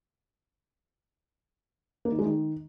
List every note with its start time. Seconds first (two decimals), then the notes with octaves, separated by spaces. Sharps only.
2.05 A#3
2.12 D#3
2.19 G#3
2.25 D#3